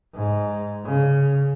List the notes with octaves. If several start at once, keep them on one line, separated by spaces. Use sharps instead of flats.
G#2
C#3